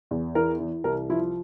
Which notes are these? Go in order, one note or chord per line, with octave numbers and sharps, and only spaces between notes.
E2
E3 A#4
E3
C2 A#4
F3 E4